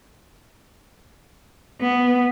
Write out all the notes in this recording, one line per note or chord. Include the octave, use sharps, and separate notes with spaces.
B3